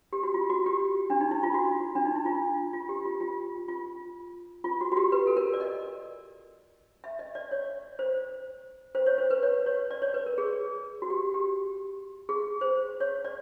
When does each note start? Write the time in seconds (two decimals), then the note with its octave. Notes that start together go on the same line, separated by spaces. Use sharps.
0.13 G4
0.23 F#4
0.34 F4
0.50 F#4
0.66 G4
1.10 D4
1.21 D#4
1.31 E4
1.43 F4
1.54 F#4
1.95 D4
2.05 D#4
2.16 E4
2.26 F4
2.73 F4
2.89 G4
3.05 F4
3.21 F4
3.68 F4
4.64 F4
4.81 F#4
4.92 F#4
4.97 G4
5.12 B4
5.27 A4
5.37 A#4
5.53 D5
5.60 D#5
7.04 E5
7.19 D#5
7.35 D5
7.51 C#5
7.99 C5
8.95 C5
9.06 C#5
9.18 C5
9.30 B4
9.43 C#5
9.66 C#5
9.91 D5
10.02 C#5
10.14 B4
10.26 A#4
10.38 G#4
11.02 F#4
11.10 G4
11.34 G4
12.29 G#4
12.61 C5
13.00 C#5
13.25 D5